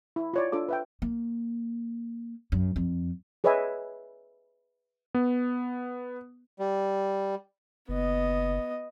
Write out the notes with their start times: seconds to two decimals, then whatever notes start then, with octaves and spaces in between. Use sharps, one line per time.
0.16 E4
0.34 F4 C#5 D5
0.52 D4 F4 A4 D6
0.69 B4 E5 G5
1.02 A#3
2.52 F#2
2.76 F2
3.44 G#4 B4 C#5 D#5 E5 G#5
5.15 B3
6.59 G3
7.89 F#1 B3 D#5